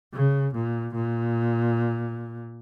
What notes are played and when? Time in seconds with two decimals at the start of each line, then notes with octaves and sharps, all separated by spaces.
0.14 C#3
0.55 A#2
0.94 A#2